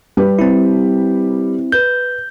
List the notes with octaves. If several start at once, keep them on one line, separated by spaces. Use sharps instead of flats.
G3 G4 B4
C4 E4
B4 G6